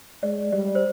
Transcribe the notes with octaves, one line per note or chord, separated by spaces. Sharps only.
G#3 D5
G3 D5
C5